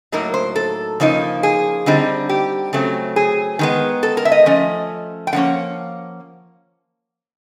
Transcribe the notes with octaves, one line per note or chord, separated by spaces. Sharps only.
A2 F#3 A#3 D#4 A#4
C5
A4
C#3 F3 A#3 D#4
G#4
D3 G3 C4 D#4
G4
C#3 F#3 A3 C4
G#4
D#3 G#3 B3
A4
A#4
E5
D#5
F3 A3 C#4
G5
D3 F3 A#3 C#4 F#5